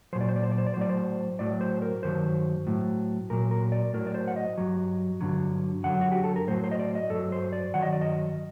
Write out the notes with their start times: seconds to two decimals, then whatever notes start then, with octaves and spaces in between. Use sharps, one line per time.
0.13 A#2 F#3 C5
0.21 D5
0.29 C5
0.36 D5
0.43 C5
0.51 D5
0.58 C5
0.67 D5
0.74 C5
0.77 A2 F#3 D5
0.90 C5
1.39 A2 F#3 D5
1.61 C5
1.82 A#4
2.03 G2 D#3 F#3 C5
2.67 A2 F#3
3.30 A#2 F#3 A#4
3.51 A#4
3.72 D5
3.94 A2 F#3 A#4
4.07 D5
4.14 C5
4.28 F#5
4.36 D#5
4.58 G2 F#3
5.21 G2 D3 F#3
5.83 F#2 D3 F#3 F#5
6.01 F#4
6.12 G4
6.24 A4
6.36 A#4
6.48 A2 F#3 C5
6.64 C5
6.71 D#5
6.79 D5
6.95 D#5
7.10 G2 F#3 A4
7.32 C5
7.53 D5
7.74 G2 D#3 F#3 F#5
7.83 D#5
7.92 D5
8.01 D#5